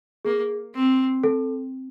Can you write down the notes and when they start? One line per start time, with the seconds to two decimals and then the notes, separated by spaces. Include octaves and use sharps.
0.25 A#3 G#4
0.75 C4
1.24 A4